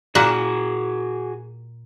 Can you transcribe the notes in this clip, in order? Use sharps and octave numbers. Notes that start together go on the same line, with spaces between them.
A#2 A#3 F#4 G#4 F#5